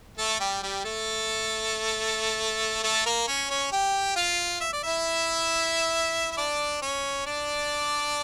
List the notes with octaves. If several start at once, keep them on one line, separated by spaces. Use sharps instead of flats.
A3 A4
G3 G4
G3 G4
A3 A4
A3 A4
A#3 A#4
C#4 C#5
C#4 C#5
G4 G5
F4 F5
E5
D5
E4 E5
E5
D4 D5
C#4 C#5
D4 D5